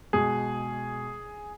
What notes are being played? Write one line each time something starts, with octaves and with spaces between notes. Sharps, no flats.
B2 G#3 G#4